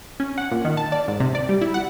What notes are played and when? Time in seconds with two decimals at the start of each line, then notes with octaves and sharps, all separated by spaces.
0.20 C#4
0.38 F#5
0.51 A#2
0.65 D#3
0.77 A5
0.92 D5
1.08 G#2
1.20 C3
1.35 D5
1.49 G3
1.61 E4
1.74 F#5